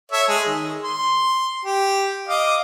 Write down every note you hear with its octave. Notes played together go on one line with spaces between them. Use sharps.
A4 C#5 E5
G#3 G#4
D#3
C6
G4
D#5 F5 D6